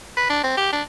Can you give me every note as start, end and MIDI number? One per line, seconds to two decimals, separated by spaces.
0.17 0.26 71
0.30 0.41 62
0.44 0.53 60
0.57 0.72 67
0.72 0.82 62